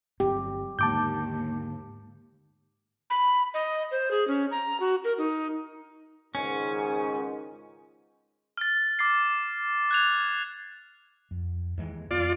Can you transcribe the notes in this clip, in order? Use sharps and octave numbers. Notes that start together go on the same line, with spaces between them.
G1 F#3 C4 G4
D#2 G#2 D3 G#3 A5 D6 G6
B5
D#5
C5
G#4
C#4
A#5
F#4
A#4
D#4
C#2 G#2 D#3 C#4
F6 A6
D6 A6 C7
F#6 G#6 F7
F2
D#2 E3 G#3
F2 B3 F4 D5